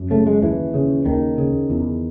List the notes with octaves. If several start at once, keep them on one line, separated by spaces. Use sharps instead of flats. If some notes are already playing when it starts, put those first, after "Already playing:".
Already playing: F#2
C#3 A3
G#3
D#2 E3
C#3
D#2 D#3
C#3
E2